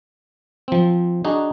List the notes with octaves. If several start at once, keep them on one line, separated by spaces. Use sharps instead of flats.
F3 C4
D4 D#4 F#4 G#4